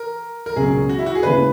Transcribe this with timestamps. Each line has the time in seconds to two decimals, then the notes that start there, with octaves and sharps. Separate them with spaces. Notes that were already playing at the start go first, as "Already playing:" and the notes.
Already playing: A#4
0.46 A#4
0.56 C#2 B2 F#3 C#4 F#4 G#4
0.89 F#4
0.99 E4
1.06 F#4
1.15 G#4
1.23 D#2 C#3 G#3 B3 E4 B4